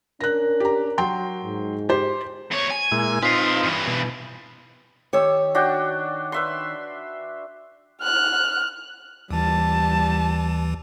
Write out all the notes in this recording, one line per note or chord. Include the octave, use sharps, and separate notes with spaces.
C#4 D4 A#4 F#6 A#6
G4 A#5
F#3 G5 C6
G#2
G4 C5
E2 C#5
G#5
A#2 G#3 E4
C4 D#4 F4 B4 F5
G2 E3
B2
D#3 G4 C#5 E6
D4 F#4 G5
B4 E5 C6
F6 F#6
D#2 E3 G3 A5